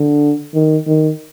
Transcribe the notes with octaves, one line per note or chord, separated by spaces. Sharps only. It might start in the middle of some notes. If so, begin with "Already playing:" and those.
Already playing: D3
D#3
D#3